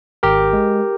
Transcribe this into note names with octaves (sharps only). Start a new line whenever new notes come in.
G#1 G4 A#4
G#3